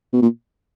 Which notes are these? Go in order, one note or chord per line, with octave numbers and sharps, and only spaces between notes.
B2
A#2